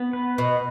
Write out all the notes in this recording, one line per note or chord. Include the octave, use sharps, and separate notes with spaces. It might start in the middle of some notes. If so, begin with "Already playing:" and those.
Already playing: B3
B4
B2 B4